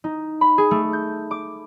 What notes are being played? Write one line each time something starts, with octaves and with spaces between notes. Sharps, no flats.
D#4
B5
G#4
A3
G6
D6